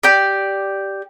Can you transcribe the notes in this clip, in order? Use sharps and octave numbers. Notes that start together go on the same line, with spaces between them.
G4 D5